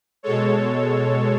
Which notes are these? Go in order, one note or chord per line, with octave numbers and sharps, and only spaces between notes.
B2 G#3 A4 C#5